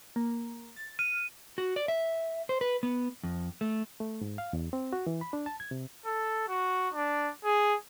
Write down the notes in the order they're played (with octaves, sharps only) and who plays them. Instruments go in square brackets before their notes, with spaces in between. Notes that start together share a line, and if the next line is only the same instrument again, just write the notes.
[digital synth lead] A#3
A6
[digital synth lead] F6 [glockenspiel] D#7
[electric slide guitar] F#4
D5
E5
C5
B4
B3
F2
A3
[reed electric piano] A3
G#2
F5
E2
C4
F#4
E3
B5
D4
A5
G#6
C3
[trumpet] A4
F#4
D4
G#4